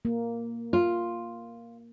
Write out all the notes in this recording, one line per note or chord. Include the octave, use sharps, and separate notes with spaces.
A#3
F4